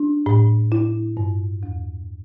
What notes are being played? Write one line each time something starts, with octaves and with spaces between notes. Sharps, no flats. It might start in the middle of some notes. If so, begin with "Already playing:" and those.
Already playing: D4
A2
E4
G2
E2